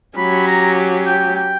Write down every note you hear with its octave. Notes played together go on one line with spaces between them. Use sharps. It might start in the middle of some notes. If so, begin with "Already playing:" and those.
F#3 C#4 G4 B5
A#5
G5
G5